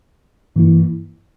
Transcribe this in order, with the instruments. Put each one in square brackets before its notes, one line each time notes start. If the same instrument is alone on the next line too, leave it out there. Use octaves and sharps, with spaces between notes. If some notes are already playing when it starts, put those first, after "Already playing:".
[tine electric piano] G2 E3 A#3 E4